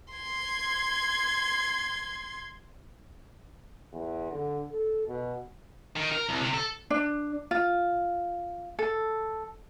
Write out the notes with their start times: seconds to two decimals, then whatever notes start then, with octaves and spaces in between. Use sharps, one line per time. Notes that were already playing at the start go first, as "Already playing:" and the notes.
0.14 C6 G#6
3.93 E2
4.32 D3
4.71 A4
5.08 B2
5.96 D#3
6.11 A#4
6.29 C2
6.41 C3
6.54 A4
6.90 D4
7.51 F4
8.79 A4